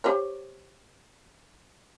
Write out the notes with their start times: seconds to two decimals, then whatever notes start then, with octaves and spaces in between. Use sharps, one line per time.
0.04 G4 C5 C#5